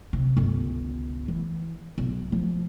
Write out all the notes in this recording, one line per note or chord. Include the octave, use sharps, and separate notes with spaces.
C3
G1 C#2
E3
B1
F3